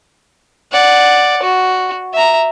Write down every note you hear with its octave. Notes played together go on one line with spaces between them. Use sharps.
D5 F#5
F#4
E5 A#5